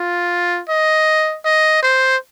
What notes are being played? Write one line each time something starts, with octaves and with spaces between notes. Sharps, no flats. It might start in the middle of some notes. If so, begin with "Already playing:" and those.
Already playing: F4
D#5
D#5
C5